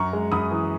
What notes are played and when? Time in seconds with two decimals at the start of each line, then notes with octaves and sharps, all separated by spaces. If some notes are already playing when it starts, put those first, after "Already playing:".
Already playing: F#2 A#5 C#6
0.13 G#3
0.32 F#2 B5 D#6
0.51 E3